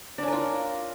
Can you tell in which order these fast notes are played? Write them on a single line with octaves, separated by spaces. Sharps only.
D4 C#4 A#4 F4